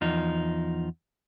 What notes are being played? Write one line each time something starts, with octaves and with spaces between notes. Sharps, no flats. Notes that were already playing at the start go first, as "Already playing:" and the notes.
E2 F3 D#4